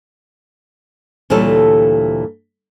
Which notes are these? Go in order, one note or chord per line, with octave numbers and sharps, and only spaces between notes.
D2 A#2 E3 G3 A4 C#5